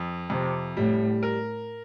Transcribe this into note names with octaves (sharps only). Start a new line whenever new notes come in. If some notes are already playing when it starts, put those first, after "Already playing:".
Already playing: F2
F2 C3
A2 G3
A#4